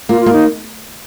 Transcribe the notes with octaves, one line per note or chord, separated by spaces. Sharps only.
A#3 F4
F4
A#3
D#4